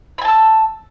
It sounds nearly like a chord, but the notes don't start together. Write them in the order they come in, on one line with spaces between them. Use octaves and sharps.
B5 G#5 A5 E6